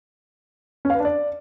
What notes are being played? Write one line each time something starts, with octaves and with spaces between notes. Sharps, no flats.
C#4
F5
B4
D4
D5